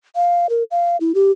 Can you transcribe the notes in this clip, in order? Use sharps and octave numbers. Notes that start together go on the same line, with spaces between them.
F5
A#4
F5
E4
G4